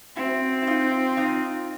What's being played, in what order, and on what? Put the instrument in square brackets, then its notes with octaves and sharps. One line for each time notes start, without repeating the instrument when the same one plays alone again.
[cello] C4 [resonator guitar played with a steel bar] E4 F#4
[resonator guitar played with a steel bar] E4
D#4 F4
D#4 F4